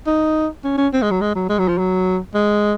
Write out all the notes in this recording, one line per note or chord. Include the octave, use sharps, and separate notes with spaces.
D#4
C#4
C#4
C4
G#3
F#3
G#3
F#3
G#3
F#3
F3
F#3
G#3